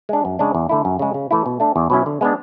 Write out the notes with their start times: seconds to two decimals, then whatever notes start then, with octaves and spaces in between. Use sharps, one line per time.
0.09 G#3 D4
0.25 F#2
0.39 C#3 G#3 D4
0.55 E2
0.69 D3 A3 E4
0.85 F#2
0.99 C#3 G#3
1.14 C#3
1.31 E3 A3 E4
1.46 B2
1.60 A3 D4
1.76 E2
1.90 B2 F#3 C#4 E4
2.06 D3
2.21 G#3 B3 D4